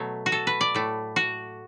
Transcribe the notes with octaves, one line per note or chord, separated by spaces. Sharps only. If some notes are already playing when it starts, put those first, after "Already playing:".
Already playing: B2 F#3 A3
F#4
A4
B4
D5
A2 A3
F#4